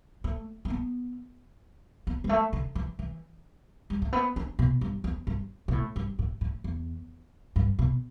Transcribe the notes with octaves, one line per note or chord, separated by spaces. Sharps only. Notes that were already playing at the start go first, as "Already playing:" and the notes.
A3
A3
B3
B3
G3
A3
D3
E3
E3
G3
A3
B3
D4
B2
G2
E2
G2
B2
A2
G2
A2
A2
E2
G2
B2